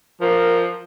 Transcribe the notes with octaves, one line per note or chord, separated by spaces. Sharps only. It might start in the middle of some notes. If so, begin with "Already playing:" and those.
F3 A#4